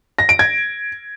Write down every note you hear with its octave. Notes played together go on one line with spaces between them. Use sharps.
A#6
D7
G#6